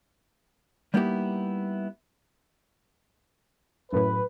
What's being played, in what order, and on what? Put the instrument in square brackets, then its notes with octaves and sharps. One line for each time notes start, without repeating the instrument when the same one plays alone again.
[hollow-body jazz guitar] G3 A#3 B3 D#4 E4 G4
[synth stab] F#2 A2 [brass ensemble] B4